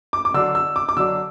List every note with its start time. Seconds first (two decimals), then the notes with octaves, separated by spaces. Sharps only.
0.13 D6
0.25 D6
0.34 D3 F#3 D4 E6
0.55 E6
0.76 D6
0.89 D6
0.97 D3 F#3 D4 E6